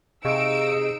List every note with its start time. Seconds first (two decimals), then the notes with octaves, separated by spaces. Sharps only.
0.25 C3 D#4 G#4 D#5 F5 C#6 E6 D7